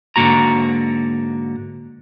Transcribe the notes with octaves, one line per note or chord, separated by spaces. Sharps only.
G#2 D3 D#3 A#3 F#4 A#5